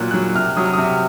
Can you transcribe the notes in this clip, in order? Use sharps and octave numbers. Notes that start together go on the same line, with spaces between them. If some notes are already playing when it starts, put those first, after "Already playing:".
Already playing: A#2 F#3 F#6
F#3 F#6
C3 F6
F#3 D#6
F6
C3 D#6